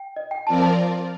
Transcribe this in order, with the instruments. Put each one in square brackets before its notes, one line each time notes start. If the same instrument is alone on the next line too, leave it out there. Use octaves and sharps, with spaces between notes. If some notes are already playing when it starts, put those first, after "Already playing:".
Already playing: [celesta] G5
D#5
G5
[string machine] F3 C4 F4 A#4 D5 [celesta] A5
[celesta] A5